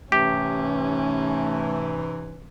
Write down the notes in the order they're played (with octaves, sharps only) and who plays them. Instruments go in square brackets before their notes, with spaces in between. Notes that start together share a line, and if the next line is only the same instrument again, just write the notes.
[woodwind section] G#2 C3 E3 [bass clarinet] A3 [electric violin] C#4 [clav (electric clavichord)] G4